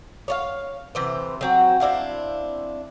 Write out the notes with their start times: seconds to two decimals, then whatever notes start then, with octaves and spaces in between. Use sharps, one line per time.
0.28 C#5 D5 F5
0.95 C3 E3 C5
1.41 F#3 C4 F#4
1.80 C4 D4 E4 F5